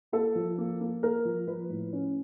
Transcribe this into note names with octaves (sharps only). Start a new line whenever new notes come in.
A#3 A4
F3
A#3
A#3
A#3 A#4
F3
F3 B4
A2
C#4